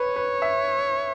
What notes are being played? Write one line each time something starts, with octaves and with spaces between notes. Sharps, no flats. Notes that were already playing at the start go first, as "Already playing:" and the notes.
Already playing: B4 C#5
B4
E5